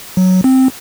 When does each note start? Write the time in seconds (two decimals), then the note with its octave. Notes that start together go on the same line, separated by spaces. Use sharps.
0.17 F#3
0.44 C4